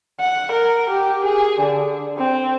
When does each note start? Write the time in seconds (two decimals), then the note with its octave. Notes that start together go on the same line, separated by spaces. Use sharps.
0.20 F#5
0.52 A#4
0.90 G4
1.25 G#4
1.60 D3
2.18 C4